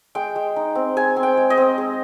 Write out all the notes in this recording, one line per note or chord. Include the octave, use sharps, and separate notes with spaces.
G#3 G5
G#3
D#4
C4
G#3 G#5
C4
G5
G#3
D#5
C4
G#3